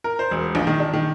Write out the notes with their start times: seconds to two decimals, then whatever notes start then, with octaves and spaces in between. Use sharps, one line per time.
0.04 A#4
0.19 C5
0.31 E1
0.55 A#1
0.67 D#3
0.80 D4
0.93 D#3